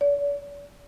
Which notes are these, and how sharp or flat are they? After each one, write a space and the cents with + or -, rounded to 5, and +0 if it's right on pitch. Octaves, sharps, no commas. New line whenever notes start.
D5 -45